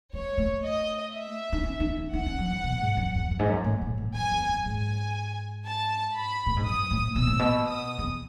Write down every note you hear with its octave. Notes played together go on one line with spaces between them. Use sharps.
G#3 C#5
A3
D#5
E5
D#4
C#4
D#4
C#4
D#4 F#5
C#4
F#3
E3
B2
G#2
F#2
E2
F#2
G#2
F#2
A2
A2
A2
F#2 G#5
E2
F#2
G#2 G#5
A5
B5
A2
G#2
F#2 D#6
A2
B2 E6
A2
B2
D#6
E2